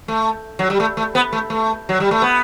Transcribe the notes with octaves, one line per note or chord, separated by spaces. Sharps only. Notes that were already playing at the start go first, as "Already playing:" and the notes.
A3
F#3
G3
A3
A3
B3
A3
A3
F#3
G3
A3
B3